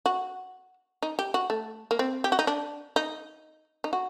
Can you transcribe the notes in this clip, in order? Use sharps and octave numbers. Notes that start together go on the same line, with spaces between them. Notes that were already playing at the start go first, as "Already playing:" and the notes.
F#4
D#4
G4
F#4
A3
A#3
C4
G4
F#4
D#4
D4
D#4
D#4
F#4